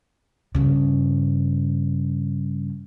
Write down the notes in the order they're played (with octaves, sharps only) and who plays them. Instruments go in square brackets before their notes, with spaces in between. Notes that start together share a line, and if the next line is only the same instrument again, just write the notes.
[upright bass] G2 C#3